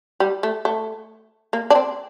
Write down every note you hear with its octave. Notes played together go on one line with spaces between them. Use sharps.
G3
A3
A3
A#3
D4
C4